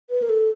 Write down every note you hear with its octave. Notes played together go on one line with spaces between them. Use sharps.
B4
A#4
A4